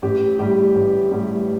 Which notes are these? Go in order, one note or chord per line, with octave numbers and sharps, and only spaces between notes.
A1 G4
A2 G3 G4
A1
A2 G3